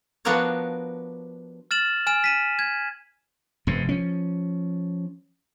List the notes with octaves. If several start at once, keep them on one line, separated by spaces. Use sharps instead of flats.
F3 B3 D4 F#4 A#4 C#5
F6 A6 E7 F#7
G#5 F6 E7
B6 D#7 E7
G#6
F1 G2 C3
F3 C#4